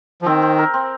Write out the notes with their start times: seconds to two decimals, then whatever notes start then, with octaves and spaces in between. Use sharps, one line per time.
0.22 F3
0.26 D#3 C4
0.42 C4
0.58 A#4
0.74 C4